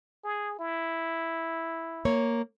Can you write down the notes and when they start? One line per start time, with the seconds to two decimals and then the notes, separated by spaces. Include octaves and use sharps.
0.24 G#4
0.59 E4
2.05 A#3 C#5